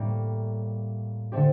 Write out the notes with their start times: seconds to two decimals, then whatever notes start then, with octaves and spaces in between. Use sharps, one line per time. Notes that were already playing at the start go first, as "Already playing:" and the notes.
Already playing: A2 G3 A#3
1.32 D3 A3 C4 G4